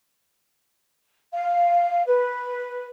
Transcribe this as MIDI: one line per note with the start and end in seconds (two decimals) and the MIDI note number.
1.33 2.02 77
2.07 2.86 71